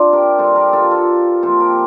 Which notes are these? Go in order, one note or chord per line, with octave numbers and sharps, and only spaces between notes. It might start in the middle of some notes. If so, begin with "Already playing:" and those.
Already playing: C3 C4 D4 F4 C5 D5
G4 A#4
C3 G3 C4 A4 C5
G4 A#4
F4 A4
F4 A4
C3 F3 A#3 A4 C5
G4 A#4